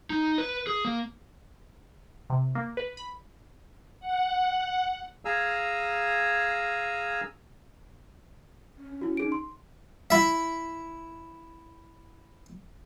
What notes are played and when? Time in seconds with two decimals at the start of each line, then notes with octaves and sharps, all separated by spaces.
0.10 D#4
0.38 B4
0.67 G#4
0.85 A#3
2.30 C3
2.55 A#3
2.77 B4
2.97 B5
4.00 F#5
5.25 G#4 F5 G#5 A#5 E6
8.78 C#4
9.01 E4 F#4
9.17 D#4 G#4 D7
9.32 C6
10.10 E4 E5